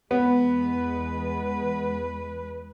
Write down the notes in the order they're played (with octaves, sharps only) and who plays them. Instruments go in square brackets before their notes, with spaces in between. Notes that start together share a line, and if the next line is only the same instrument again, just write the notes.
[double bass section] E2 G#3 [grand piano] B3 [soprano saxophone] B4